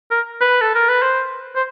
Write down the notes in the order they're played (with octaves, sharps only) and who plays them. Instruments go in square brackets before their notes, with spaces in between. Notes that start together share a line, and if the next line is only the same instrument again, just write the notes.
[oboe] A#4
B4
A4
A#4
B4
C5
C5